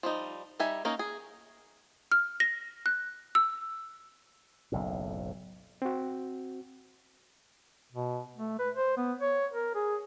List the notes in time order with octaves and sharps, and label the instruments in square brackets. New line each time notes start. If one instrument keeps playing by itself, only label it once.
[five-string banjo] F3 G3 D#4
G3 D#4 E5 G#5
A#3 C#4 D#4 A#4
G#4
[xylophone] F6
A#6
F#6
E6
[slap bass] F#1 B1 A2
[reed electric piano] C4 F#4
[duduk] B2
A3
B4
C5
B3
C#5
A#4
G#4